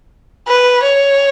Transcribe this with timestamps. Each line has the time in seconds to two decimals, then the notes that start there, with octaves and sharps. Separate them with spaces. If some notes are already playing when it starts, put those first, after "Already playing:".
0.48 B4
0.83 C#5